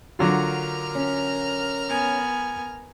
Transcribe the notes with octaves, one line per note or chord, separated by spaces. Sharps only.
D3 F#3 F4 A#4 A#5 F6
C#4
B3 G#5